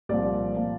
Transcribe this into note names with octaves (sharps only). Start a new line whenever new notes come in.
C2 A#2 F3 D5
A#2 F3